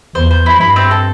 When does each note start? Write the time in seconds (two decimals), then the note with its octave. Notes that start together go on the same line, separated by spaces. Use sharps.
0.15 E2 C5
0.31 C5
0.46 E4
0.61 G2 E4
0.76 C4
0.91 A4